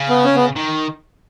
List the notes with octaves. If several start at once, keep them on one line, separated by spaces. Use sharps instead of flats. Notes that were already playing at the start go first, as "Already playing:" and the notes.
Already playing: C#3
B3
C#4
B3
D#3